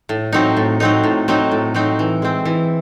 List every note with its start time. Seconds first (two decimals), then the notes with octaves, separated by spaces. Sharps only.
0.09 A2
0.33 F#3 C4 D#4
0.57 A2
0.80 F#3 C4 D#4
1.04 A2
1.28 F#3 C4 D#4
1.51 A2
1.74 F#3 C4 D#4
1.99 E3
2.22 G#3 C4
2.45 E3